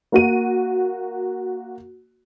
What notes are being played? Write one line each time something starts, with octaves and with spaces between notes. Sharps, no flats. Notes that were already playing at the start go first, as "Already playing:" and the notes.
A#3 F#4 D#7